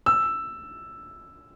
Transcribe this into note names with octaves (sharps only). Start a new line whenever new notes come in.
E6